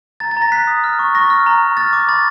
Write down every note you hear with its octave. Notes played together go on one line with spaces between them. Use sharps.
A#5 A6
A6
A#5
A#6
F#6 B6
D#6
F6
C#6
C#6 A#6
F6
A#5
A#5
F6 A6
D6
B5 A6